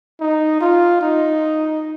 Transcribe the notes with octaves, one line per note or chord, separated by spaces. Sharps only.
D#4
F4
D#4